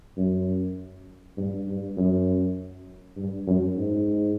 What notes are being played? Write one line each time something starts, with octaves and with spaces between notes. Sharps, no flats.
F#2
G2
G2
F#2
G2
F#2
G#2